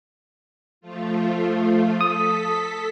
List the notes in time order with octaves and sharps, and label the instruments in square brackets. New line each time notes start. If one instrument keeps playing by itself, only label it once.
[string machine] F3 A3 F4
[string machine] A4 B6 [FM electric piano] D#6